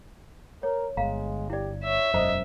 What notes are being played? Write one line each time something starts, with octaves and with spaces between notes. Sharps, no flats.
A#4 C#5
G1 G#3 F5 A#5
E4 G4 D5
C#5 E5
E1 F#2 C5 D#5 A#5